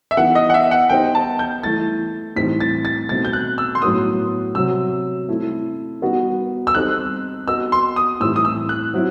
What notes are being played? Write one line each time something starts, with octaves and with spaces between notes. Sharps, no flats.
E5
E3 B3 D#4 F#5
D#5
F#5
E5
F#5
B3 D#4 G4 C5 D#5 G5
A5
G6
E3 A3 E4 A6
A2 E3 G3 C4 D#4 B6
A6
A6
B2 A3 C4 D#4 A6
G6
F#6
E6
C6
A2 F#3 B3 D#6
C3 F#3 C4 E6
A3 C4 E4
G3 B3 D#4 F#4
E6
G3 C4 D#4 A4 F#6
B3 F#4 B4 D#5 E6
C6
D#6
A2 E3 G3 C4 E4 E6
D#6
E6
F#6
F#3 C4 E4